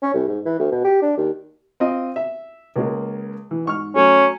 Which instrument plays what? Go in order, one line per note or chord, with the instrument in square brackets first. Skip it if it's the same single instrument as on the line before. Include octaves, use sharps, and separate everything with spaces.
[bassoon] C#4
C2
G#2
E3
D2
B2
G4
D4
D#2
[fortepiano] C4 F4 D#5
E5
C#2 G#3 A#3
E3
G#2 C#6 F6
[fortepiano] F#3 A3 [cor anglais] C#4